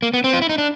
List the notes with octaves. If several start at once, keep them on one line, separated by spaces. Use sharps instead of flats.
A#3
B3
C4
F4
E4
D#4
D4